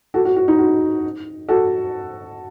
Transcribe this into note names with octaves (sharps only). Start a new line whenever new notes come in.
F#4 A4
F#4
F#4
D#4
F#4
F#4 A4